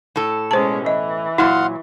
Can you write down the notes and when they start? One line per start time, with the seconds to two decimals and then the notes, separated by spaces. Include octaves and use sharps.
0.16 A2 A4
0.51 B2 G#3 C#4 C5 A5
0.86 E3 D#5
1.38 A#2 F#3 E4 F5 F#5 C6